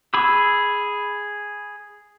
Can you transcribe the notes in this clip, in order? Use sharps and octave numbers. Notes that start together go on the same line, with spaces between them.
G#4 B5 D#6 E6